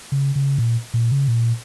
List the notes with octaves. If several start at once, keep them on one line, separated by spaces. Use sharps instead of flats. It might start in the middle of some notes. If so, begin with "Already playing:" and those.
C#3
C#3
A#2
A#2
C#3
A#2